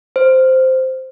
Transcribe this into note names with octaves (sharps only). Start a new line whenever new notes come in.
C5